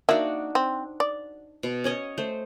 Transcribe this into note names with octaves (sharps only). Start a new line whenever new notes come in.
A#3 D4 D#4 F#4 E5
C4
D5
B2
C#4 C#5 D#5
A3 C5